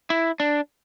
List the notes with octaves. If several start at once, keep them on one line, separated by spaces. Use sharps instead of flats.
E4
D4